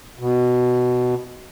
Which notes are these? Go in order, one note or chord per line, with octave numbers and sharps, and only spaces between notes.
B2